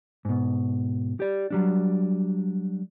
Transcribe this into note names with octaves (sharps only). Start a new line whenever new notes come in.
G#2 B2
G4 D5
F#3 G3 D4